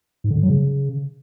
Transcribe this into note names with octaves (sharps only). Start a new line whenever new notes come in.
G#2
D3
G2
F#3
C#3